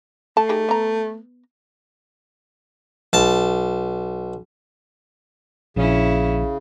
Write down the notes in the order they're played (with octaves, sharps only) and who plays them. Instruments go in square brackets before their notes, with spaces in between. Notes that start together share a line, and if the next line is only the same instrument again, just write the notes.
[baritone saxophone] A3 [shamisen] A5
[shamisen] D#4 G4 G#4
B3 A#5
[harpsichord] B1 A5
[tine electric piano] A#1 [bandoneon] C#3 [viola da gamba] C#4 E4